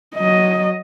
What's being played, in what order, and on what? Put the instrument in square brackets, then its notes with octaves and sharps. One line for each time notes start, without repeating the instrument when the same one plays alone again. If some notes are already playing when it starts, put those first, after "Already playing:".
[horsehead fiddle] F#3 D#5